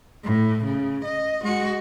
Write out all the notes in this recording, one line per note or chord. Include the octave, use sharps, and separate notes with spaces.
A2
C#3
D#5
G#3 F#4